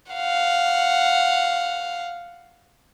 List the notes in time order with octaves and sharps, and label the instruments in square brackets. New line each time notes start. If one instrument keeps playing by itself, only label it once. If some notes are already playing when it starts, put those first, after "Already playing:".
[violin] F5 F#5